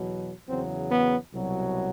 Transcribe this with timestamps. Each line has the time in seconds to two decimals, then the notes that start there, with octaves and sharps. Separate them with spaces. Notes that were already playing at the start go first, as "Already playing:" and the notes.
Already playing: E2 B2 F#3
0.47 E2 C#3 F#3 C4
0.90 B3
1.33 C2 B2 F#3